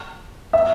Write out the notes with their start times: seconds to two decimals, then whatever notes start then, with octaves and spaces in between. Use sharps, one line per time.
0.53 E5